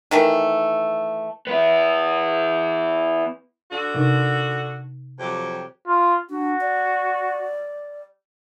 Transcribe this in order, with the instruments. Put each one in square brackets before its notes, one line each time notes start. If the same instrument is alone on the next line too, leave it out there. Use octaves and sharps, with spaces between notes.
[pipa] D#3 E3 A3
[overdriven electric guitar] B3 E4
[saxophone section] D3 F#4
[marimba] C3 D#4
[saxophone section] F2 F#3 G4
[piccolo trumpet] F4
[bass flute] D4 [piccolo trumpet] F#4
[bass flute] D5